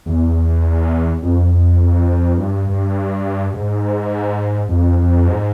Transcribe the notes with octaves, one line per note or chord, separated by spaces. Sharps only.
E2
F2
F2
F2
G2
G2
G#2
F2
F2
G#2